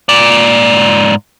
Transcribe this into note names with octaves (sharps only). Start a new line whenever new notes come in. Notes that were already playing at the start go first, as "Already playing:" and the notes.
G#2 D5